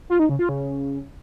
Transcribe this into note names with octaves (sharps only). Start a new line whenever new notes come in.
F4
D#4
C#3
F4
C#3